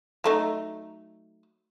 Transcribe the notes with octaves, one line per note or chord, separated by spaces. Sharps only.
F#3 A3 D#4